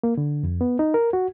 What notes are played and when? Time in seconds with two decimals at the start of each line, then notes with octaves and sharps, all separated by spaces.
0.03 A#3
0.17 D3
0.43 F2
0.61 B3
0.79 D#4
0.94 A#4
1.13 F#4